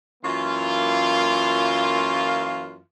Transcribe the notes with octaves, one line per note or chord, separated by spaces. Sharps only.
F#2 E3 A#3 F4